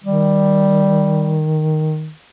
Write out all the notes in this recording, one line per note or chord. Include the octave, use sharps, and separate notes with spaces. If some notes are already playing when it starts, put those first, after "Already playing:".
D#3 G3